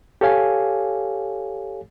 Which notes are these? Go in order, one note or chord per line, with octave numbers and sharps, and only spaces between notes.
G4 A4 C#5 F5 G#5